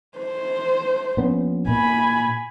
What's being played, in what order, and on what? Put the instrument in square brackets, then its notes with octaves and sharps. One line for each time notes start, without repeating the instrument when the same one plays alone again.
[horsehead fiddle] C5
[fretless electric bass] A#1 B3 C#4
[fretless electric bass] A#2 [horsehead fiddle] G#5 B5